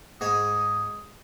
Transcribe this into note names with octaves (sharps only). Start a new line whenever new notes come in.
G#2 G#4 D#6